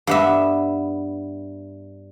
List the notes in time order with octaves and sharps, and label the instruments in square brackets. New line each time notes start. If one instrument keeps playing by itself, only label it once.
[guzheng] G2 B3 E5